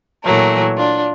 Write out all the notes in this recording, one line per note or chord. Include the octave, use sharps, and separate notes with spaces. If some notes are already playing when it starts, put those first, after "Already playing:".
A#2 E3 F#3 A3 A#4
D4 F4